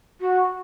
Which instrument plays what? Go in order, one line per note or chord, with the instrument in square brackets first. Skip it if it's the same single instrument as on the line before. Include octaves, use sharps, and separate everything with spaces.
[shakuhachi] F#4